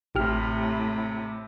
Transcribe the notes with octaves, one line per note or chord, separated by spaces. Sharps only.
A1 A2 C3 G4 F6